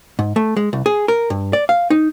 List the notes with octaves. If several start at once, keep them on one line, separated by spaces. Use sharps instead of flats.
G#2
A3
G#3
C2
G#4
A#4
G2
D5
F5
D#4